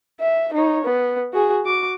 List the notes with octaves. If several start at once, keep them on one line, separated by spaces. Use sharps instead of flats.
E5
D#4 C#5
B3
F#4 G#4
F#4 D6